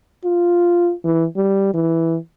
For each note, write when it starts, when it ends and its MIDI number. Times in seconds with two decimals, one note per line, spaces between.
0.25 0.93 65
1.05 1.26 52
1.36 1.73 55
1.74 2.17 52